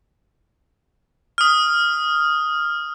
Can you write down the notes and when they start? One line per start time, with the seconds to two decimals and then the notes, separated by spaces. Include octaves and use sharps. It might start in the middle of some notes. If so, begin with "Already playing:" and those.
1.38 D#6 F6